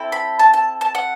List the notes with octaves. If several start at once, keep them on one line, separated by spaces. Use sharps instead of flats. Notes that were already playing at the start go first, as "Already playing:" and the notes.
Already playing: C4 E4 A4
B5
A5
A5
A5
F#5